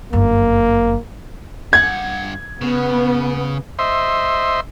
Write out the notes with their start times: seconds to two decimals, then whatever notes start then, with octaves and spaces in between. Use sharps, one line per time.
0.13 G1 F#2 A#3
1.73 G2 F#5 G#6
2.61 C#3 B3
3.79 C5 D#5 E5 C6